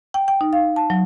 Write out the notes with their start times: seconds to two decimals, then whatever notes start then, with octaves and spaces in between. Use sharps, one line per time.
0.14 G5
0.28 G5
0.41 D#4
0.53 F5
0.76 A5
0.90 F#3